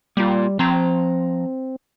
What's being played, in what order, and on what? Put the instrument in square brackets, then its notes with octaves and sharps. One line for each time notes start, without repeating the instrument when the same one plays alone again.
[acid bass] G3 [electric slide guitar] A#3 F4
[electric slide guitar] F3 A#5 [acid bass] C4